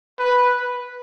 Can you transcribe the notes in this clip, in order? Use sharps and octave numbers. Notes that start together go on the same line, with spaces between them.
B4